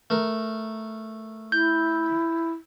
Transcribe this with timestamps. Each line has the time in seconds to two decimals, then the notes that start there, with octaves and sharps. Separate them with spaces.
0.10 A3 A#4
1.52 E4 G6